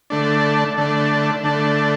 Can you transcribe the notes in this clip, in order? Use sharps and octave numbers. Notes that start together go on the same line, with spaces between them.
D3 A3 D4
D3 A3 D4
D3 A3 D4